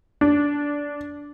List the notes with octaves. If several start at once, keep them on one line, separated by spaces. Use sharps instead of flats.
D4